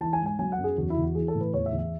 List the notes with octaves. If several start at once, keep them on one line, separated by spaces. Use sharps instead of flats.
E3 A5
G#5
G#2
G#5
F#3 G#5
F#5
F#2
G#4
E2 F#4
E4
E2
F#4
E3 G#4
A4
A2
B4
E2 C#5
E5
E2
E5